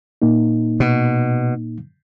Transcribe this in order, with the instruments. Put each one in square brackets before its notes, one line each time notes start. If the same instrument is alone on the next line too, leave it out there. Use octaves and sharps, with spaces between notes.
[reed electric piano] A#2 A#3 D#4
[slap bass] B2